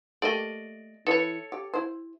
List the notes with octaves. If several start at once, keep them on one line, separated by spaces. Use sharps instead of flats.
A3 A#3 G4 D5 D#5
E3 D#4 A4 B4 C#5
G4
E4 C5